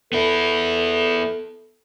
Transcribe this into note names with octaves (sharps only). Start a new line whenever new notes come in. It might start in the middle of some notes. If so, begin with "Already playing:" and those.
B3 E4 A4